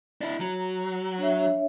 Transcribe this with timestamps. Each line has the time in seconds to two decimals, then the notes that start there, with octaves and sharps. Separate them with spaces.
0.21 D4 E4
0.40 F#3 A#5
1.19 D4 C#5 E5